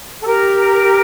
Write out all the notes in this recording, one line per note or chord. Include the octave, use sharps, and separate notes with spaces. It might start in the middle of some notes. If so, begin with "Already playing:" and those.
A4
G4 A#4